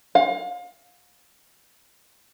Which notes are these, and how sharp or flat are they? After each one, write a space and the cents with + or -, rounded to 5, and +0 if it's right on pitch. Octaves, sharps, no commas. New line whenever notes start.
F5 +35